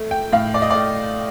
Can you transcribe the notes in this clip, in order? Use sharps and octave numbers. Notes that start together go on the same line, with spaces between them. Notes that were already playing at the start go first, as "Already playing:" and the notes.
Already playing: A3
G5
A2 F5
D5
D#5
A2 D5